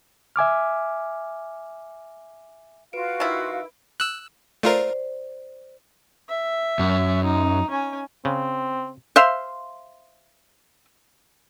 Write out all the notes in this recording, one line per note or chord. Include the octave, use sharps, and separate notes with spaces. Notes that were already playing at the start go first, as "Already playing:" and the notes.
E5 G#5 D6 F6
F4 F#4 B4 F5 D7
D#3 E4
E6 F#6
A3 F4 A#4 C5 D5
E5
F#2
D#4
C#4 G#5
C#3 C4
C5 E5 F5 C6